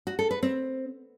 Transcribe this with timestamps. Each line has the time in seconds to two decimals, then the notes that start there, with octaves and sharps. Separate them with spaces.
0.07 F#4
0.19 A4
0.31 B4
0.43 C4